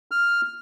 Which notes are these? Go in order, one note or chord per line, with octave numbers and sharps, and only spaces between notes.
F6